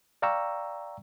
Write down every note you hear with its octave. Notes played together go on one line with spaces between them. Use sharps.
D5 F5 G5 A#5 C#6 E6